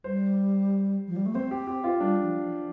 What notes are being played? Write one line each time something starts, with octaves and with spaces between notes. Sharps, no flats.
G3 C5
F3
G3
A3
C4 C5
G4
G4
F4
G3 D4
F3
F3